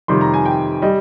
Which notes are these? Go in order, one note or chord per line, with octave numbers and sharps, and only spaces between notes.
F2 C3 D#3 G3 C6
A#5
G#5
G5
G3 D#5